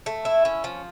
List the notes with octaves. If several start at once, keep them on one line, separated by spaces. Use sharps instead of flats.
A3
E4
C#4
F3